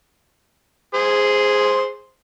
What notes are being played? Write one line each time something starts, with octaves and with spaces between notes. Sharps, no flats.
G#4 C5